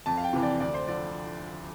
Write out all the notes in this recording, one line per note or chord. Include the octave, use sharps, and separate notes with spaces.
F2 A5
F5
G5
C3 E3
D5
D2 D5
C5
D3 F3 D5